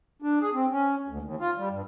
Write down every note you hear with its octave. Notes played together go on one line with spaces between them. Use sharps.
D4
G#4
C4
C#4
D2
D#2
F4
G3
G2